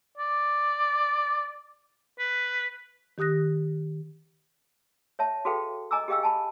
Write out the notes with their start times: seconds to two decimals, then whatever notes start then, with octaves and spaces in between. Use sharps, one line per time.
0.18 D5
2.19 B4
3.18 D#3 G4 D#6 F#6 A#6
5.19 C#5 E5 A5
5.45 F#4 G#4 A4 B4 F5 G5
5.91 D#5 G#5 A#5 D6 E6
6.08 G4 G#4 D#5 F5 G5 E6
6.23 G#5 A5 B5